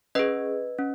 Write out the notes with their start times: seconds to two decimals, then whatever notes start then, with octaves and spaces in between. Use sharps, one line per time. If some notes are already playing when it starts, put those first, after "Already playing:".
0.15 C#4 G#4 B4 D#5
0.78 C#4